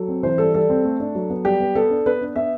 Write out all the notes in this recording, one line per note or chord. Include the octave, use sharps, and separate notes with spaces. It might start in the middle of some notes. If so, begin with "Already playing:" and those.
Already playing: F#3 A4
C4
E3 C5
G3 A4
G3 A4
C4
A3
D4
F#3
B3
G3 G4
B3
B3 A4
D4
B3 B4
D4
B3 E5